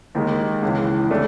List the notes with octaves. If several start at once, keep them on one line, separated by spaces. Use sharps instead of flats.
D#2 D#3 G#3
C#2 C#3 E3
C#3 E3 A3 D4